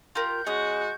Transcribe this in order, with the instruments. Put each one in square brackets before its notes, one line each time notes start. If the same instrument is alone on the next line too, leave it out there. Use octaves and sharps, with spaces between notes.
[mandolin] F4 G4 A#4 [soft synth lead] G6
[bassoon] G#3 [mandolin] C#4 D#6 [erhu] F#4